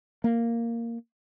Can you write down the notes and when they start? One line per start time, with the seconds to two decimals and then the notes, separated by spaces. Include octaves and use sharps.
0.24 A#3